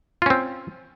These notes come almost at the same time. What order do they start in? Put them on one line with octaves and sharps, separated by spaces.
F4 C#4 C4